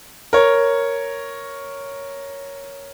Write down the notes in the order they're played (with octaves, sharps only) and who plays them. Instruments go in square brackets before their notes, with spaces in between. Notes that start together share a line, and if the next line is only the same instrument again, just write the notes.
[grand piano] A#4 C#5